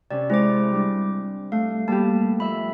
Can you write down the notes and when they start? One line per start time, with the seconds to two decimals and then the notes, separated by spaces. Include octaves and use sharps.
0.11 C3 C#4 D5
0.30 G#3 C4 E4 C5 D6
0.72 G3 D4
1.52 A3 F5
1.88 G3 A#3 B3 G4 A5
2.40 F2 E5 B5